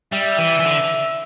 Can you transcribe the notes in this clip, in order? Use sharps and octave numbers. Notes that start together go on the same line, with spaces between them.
G3 E5
E3
E3
D3